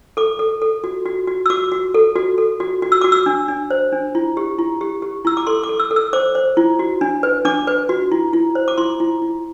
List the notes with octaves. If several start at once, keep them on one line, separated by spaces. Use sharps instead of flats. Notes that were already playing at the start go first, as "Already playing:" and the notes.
A4 D6
A4
A4
F#4
F#4
F#4
E6
F#4 D6
F#4
A4
F#4
A4
F#4
F#4
E6
F#4 D6
E6
D4
D4
C5
D4
E4
G4
E4
G4
G4
E4 E6
D6
A4 C6
D6
A4
E6
A4
E6
C5 D6
C5
E4
F#4
D4
B4
D4 D6
B4
F#4
E4
E4
C5
D6
E4 C6
E4
E4